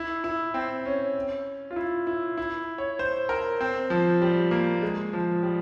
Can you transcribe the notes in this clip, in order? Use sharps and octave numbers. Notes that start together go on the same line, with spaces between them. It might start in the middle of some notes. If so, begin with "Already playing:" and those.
Already playing: E4
E4
C4
C#4
F4
E4
E4
E4
C#5
C5
A#4
C4
F3
G3
A#3
G#3
F3
G3